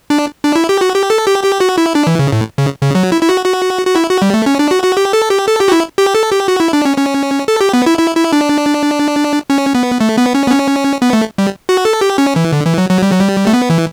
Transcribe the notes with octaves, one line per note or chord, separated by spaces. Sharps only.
D4
D4
E4
G4
F#4
G4
A4
G4
G4
F#4
E4
D4
E3
C#3
A2
C#3
C#3
F#3
E4
E4
F#4
F#4
F#4
E4
F#4
G3
A3
C#4
D4
F#4
F#4
G4
A4
G4
A4
G4
F#4
E4
G4
A4
G4
F#4
E4
D4
C#4
C#4
A4
G4
B3
E4
E4
E4
D4
C#4
B3
A3
B3
C#4
B3
C#4
B3
A3
G3
F#4
A4
G4
C#4
E3
D3
E3
F#3
F#3
G3
F#3
G3
A3
B3
E3